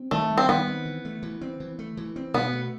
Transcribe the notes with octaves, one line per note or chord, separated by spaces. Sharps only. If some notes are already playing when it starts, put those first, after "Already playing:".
Already playing: C4
D#3 A3
G3
C4
D#3 B3
C4
E3
A3
E3
C4
E3
A3
E3
C4
B2 B3
A3